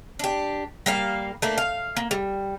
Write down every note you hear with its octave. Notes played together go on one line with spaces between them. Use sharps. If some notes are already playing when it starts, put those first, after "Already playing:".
D4 G4
G3 A#3 F5
A3 A#3 D4
F5
A#3
G3